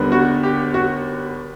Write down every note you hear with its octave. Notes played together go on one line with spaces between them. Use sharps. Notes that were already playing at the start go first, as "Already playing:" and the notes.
Already playing: D#2 D3 G3 B3
F#4
G4
F#4